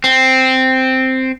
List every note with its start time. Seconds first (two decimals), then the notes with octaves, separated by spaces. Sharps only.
0.04 C4